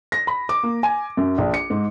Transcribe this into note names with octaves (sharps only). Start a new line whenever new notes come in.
A#6
B5
D6
A#3
G#5
F#2
A#1
C#7
G#2